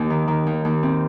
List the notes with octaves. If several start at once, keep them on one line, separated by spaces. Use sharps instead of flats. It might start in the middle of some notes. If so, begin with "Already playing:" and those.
Already playing: D#2
D#3
D#3
D#2
D#2
C4